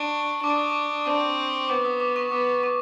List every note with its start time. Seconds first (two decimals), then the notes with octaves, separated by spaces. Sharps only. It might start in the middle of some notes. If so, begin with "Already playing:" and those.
Already playing: D4 C#6
0.43 D4 D6
0.56 D#6
0.70 D6
1.06 C4 C#6
1.68 B3 D6
1.85 D#6
2.00 D6
2.16 C#6
2.31 B3 D6
2.63 C#6